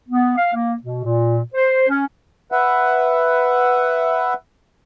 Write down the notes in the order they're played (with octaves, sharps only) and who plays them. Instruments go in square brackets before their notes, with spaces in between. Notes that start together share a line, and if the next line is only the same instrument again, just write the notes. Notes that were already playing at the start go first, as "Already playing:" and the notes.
[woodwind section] B3
F5
A#3
B2
A#2
C5
C#4
[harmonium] B4 E5 F#5